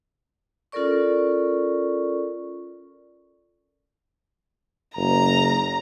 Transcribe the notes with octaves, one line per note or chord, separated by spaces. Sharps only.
C#4 F4 A4 A#4 D5 C#6
F#1 A#5